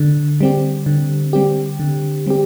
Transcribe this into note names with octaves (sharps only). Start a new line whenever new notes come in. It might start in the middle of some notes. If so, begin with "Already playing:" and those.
Already playing: D3
G3 C4 G4
D3
G3 C4 G4
D3
G3 C4 G4